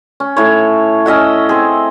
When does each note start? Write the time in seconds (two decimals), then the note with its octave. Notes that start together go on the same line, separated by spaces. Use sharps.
0.20 C#4
0.37 A2 C#5
1.06 C#4 D#5 E5 F#5
1.49 C4 G#4